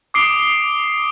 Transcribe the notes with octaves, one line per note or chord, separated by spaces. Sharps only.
D6 D#6 C7 D7 G7